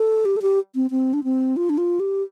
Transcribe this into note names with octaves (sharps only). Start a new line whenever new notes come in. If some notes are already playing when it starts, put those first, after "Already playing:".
Already playing: A4
G4
A4
G4
C4
C4
D4
C4
F4
D4
F4
G4